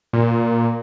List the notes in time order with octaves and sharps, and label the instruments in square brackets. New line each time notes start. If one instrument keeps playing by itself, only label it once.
[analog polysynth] A#2